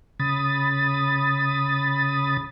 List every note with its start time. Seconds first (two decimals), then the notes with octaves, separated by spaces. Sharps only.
0.20 C#3 B5 D#6 A6